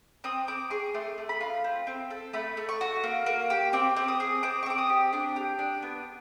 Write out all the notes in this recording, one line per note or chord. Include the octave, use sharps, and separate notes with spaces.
C4 D#6
C4 D6
G#4 C#6
A3 C6
A3
B5
F4
C4
C4
A4
A3 B5
A3
C#6
F#4
A#3
A#3
G4
C4 D6
C4
D#6
G#4
C4 D6
C#6
C4 D6
D#6
G4
D4 D6
G4
D4
B3